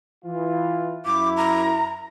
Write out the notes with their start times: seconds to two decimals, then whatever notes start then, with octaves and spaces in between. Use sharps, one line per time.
0.25 E3 F4
1.05 F#2 E4 D6
1.37 A#5